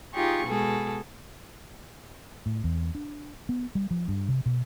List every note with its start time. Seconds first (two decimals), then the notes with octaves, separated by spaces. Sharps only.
0.14 D#4 F4 G4 G#4 C#6
0.46 B2 G#3 G#4 A4
2.46 A2
2.64 E2
2.95 D4
3.49 B3
3.75 G3
3.91 F3
4.08 G2
4.28 C3
4.46 B2